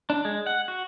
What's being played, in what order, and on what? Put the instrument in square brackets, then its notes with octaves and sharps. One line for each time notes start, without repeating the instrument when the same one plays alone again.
[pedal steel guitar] D4
G#3
F#5
F#4